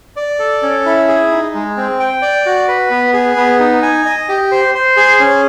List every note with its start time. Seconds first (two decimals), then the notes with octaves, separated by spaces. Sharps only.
0.16 D5
0.39 A4
0.62 C#4
0.86 E4
1.08 G#4
1.31 D#4
1.54 G#3
1.77 C4
2.00 G5
2.22 D5
2.46 F#4
2.68 B4
2.90 B3
3.13 G#4
3.36 B3
3.59 D#4
3.82 G#5
4.05 D#5
4.29 G4
4.52 C5
4.75 C5
4.97 G#4
5.20 C#4